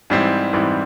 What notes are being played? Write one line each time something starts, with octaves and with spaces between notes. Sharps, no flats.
G#2 E3 G3 C4 E4
G#2 E3 G3 C4 E4